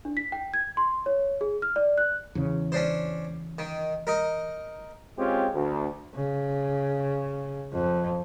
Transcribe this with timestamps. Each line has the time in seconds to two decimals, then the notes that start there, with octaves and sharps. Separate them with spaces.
0.05 D4
0.17 B6
0.32 G5
0.54 G#6
0.77 C6
1.06 C#5
1.41 G#4
1.62 F6
1.76 D5
1.98 F#6
2.35 E2 C#3
2.72 C#4 D4 C5
3.58 D#3
4.07 D#4 A#4
5.17 G#3 C4 C#4 F4 G4
5.53 D2
6.15 C#3
7.72 F2